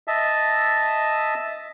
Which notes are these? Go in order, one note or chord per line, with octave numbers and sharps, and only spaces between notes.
D#5 E5 A5